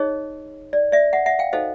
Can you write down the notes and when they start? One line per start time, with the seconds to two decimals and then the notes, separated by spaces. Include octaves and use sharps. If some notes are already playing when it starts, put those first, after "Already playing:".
Already playing: D#4 G#4 C#5 D#5
0.73 D5
0.92 D5 E5
1.13 E5 F#5
1.26 E5 F#5
1.39 F5 G5
1.53 D#4 F#4 A4 C5 D#5 F5